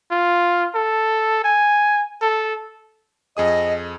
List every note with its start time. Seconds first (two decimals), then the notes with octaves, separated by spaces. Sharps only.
0.11 F4
0.75 A4
1.44 G#5
2.22 A4
3.37 F2 G#4 D#5 D#6